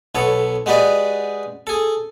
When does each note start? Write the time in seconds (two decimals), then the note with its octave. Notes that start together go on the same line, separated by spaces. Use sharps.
0.15 B1 B3 A4 C#5
0.66 G#3 F#4 G4 B4 D5 D#5
1.67 G#4 A4